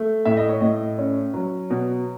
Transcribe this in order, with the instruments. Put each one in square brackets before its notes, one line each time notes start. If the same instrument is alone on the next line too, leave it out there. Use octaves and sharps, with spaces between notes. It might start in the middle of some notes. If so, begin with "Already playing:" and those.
Already playing: [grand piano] A3
A2 E5
D#5
C#5
A2 D#5
C#4
F#3
B2